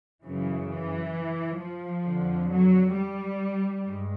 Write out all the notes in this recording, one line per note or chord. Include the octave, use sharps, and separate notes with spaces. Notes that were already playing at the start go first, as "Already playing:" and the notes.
F#2 C#3 E3
E3
F3
F2 D3
F#3
G3
G2 G#3